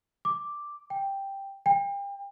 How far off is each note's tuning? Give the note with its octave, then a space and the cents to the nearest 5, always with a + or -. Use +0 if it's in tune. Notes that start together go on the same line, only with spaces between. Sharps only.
D6 +0
G5 +5
G5 +35